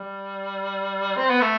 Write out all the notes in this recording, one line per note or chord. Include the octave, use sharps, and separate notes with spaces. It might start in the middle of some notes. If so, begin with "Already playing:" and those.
Already playing: G3
C4
B3
A3